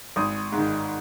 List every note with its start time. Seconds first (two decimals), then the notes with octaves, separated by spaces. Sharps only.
0.16 G#1 D#6
0.52 G#2
0.58 D#3